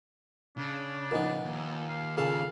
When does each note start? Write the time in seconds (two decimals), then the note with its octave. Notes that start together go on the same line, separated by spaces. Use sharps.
0.58 C#3 D4
1.11 A#2 F3 B3 D#4 A#4
1.45 D#2
1.88 F5
2.17 A#2 C#3 G#4 A4 F5